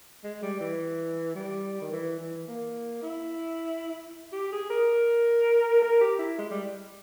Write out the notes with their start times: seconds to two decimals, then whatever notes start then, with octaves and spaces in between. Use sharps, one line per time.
0.24 G#3
0.42 G3
0.60 E3
1.35 G3
1.81 D#3
1.92 E3
2.19 E3
2.47 A#3
3.02 E4
4.32 G4
4.52 G#4
4.70 A#4
5.82 A#4
6.01 G4
6.19 E4
6.38 G#3
6.51 G3